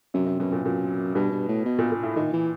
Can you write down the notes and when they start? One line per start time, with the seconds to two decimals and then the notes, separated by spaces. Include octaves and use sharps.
0.14 F#2 C3
0.26 C3
0.40 F#2 B2
0.52 A#2
0.65 F#2 A#2
1.15 G2 B2
1.32 G2
1.49 A2
1.66 B2
1.79 A#2
1.92 A#2
2.03 A2
2.16 A#2 D#3
2.33 E3